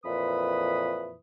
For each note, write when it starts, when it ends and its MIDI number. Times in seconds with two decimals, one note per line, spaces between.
0.04 1.16 41
0.04 1.16 46
0.04 1.16 52
0.04 1.16 71
0.04 1.16 83
0.04 1.16 87